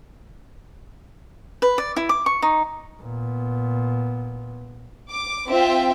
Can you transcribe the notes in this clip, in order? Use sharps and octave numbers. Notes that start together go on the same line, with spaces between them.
B4
D5
E4
D6
C#6
D#4
A#2 B3
D6
C4 F4 E5 G5